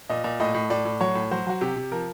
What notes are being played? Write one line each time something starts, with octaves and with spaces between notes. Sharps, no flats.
A#2 D#5
A#2
A2 D#5
A2
A2 D5
A2
F#3 C#5
A2
F#3 C5
F#3 F#4
C3 G4
C3
F3 A#4